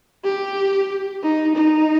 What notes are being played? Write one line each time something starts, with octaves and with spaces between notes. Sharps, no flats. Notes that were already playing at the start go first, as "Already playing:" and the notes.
G4
D#4
D#4